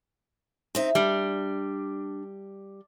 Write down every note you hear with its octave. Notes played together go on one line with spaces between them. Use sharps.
C4 D#4 E5
G3 D4